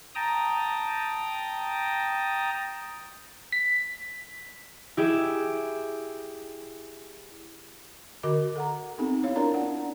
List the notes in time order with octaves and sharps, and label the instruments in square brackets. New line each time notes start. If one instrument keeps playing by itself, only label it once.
[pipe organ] G5 A5 A#5 D#6
[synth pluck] B6
[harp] E4 G4 G#4 E5
[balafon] D3 F#4 A#4 D#5 D6
A4 F#5 A#5
B3 C4 D#4 G4 A4
E4 C#5 F5
D4 E4 F4 A#4 D5 A#5
C#4 F#5